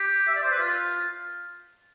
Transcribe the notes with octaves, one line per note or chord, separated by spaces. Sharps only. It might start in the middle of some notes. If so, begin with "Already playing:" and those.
Already playing: G4
E5
D5
C5
B4
F4